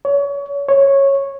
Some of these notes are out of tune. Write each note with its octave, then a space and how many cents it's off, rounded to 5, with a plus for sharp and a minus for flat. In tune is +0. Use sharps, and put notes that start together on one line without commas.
C#5 +30
C#5 -10